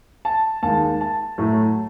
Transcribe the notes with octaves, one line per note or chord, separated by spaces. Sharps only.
A5
D#2 D#3 G#3 A5
A5
A2 F#3 A3